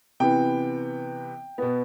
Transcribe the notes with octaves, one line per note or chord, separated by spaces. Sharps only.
C3 E3 B3 G5
B2 B3